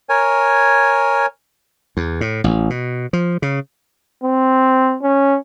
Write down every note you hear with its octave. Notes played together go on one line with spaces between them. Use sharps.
A#4 C#5 G#5
E2
A2
A1
B2
F3
C#3
C4
C#4